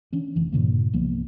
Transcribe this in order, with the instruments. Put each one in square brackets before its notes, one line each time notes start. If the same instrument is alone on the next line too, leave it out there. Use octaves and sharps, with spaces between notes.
[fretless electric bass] E3 C#4 D4
F1 E3
G2 A#2 C#3 A#3
C2 F3 A#3 B3